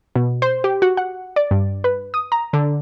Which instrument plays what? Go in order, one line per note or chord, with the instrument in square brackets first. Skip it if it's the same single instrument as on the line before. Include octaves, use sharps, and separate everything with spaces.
[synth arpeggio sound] B2
C5
G4
F#4
F#5
D5
G2
B4
D#6
A#5
D3